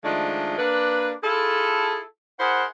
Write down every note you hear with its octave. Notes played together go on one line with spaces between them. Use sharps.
D#3 F3 G#3 A3 D4 F4
A#3 D4 B4
E4 F4 G#4 A4
E4 G#4 A#4 C5 F#5